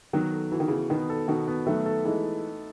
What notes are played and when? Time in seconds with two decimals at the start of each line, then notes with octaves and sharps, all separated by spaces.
0.13 D#3 F#3 B3
0.32 A4
0.52 E3 F#4
0.60 D#3
0.68 C#3 E3 B3
0.90 B2 D#3 B3
1.10 A4
1.28 B2 D#3 F#4
1.48 B3
1.66 D#3 F#3 A3
1.86 A4
2.05 E3 G#3 D#4